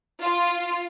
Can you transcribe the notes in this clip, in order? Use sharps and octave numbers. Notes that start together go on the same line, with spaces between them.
F4